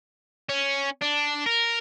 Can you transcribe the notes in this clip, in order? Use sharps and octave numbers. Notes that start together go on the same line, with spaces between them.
C#4
D4
A#4